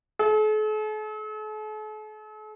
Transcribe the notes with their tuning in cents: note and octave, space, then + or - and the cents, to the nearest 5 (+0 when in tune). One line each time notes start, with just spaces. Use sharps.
A4 -45